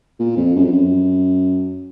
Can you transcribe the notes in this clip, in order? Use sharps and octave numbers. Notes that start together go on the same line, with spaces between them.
A#2
F2
F#2
F2
F#2